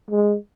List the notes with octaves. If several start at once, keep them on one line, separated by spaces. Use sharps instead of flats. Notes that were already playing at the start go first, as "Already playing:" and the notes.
G#3